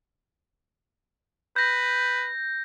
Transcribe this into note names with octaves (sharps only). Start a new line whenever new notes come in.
B4 G6 A#6